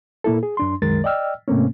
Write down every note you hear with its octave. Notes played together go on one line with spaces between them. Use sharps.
A#2 A#3 E4 A4
G#4
F#2 D4 C6
C2 F#2 D#3 G#3 A#4 A6
D5 D#5 G5 E6 F6
G#2 C3 A3 A#3 C4 C#4